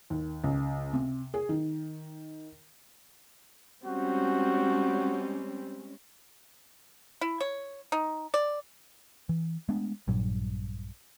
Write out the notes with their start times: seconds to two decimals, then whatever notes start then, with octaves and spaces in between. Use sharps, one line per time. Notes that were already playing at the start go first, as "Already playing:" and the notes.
0.10 D#2
0.44 C#2
0.93 C3
1.34 G#4
1.49 D#3
3.86 G3 G#3 C4 C#4 F#4
7.21 E4
7.41 C#5
7.92 D#4
8.34 D5
9.29 E3
9.69 G#3 A3 B3 D4
10.07 A#1 G2 A#2 F#3